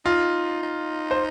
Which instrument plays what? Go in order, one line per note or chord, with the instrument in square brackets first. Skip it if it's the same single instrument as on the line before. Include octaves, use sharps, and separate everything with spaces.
[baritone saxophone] D#4 [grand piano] F4
[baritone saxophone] D#4
[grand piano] C5